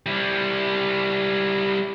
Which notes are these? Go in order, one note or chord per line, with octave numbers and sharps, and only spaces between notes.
G3 E4